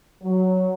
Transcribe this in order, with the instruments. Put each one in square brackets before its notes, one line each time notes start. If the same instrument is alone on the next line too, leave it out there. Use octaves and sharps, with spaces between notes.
[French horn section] F#3